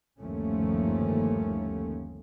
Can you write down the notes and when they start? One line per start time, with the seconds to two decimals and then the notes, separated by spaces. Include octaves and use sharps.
0.20 G1 D#2 F3 A3 A#3 C#4